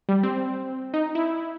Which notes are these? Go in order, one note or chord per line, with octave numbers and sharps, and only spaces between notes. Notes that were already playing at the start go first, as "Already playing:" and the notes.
G3
C4
D#4
E4